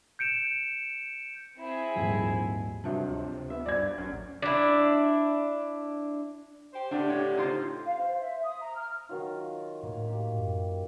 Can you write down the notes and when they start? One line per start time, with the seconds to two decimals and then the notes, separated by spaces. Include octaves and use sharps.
0.19 G6 C#7 D7 E7
1.58 C4 E4 G#4
1.95 D#1 G#2 F3
2.84 G2 C3 F3 F#3 D#5 E5 A5
3.08 D2
3.50 B3 E5
3.66 G2 C5 D5 G#6
3.98 A1 F#2
4.42 D4 E4
6.73 G4 C5
6.91 A2 D3 D4 G4
7.10 C#5
7.37 D#4 F4 C5
7.85 F5
7.99 C5
8.20 E5
8.44 D#6
8.60 A#5
8.76 F6
9.09 D#3 F#3 F4
9.83 A2 A#3
10.07 G4
10.39 F#2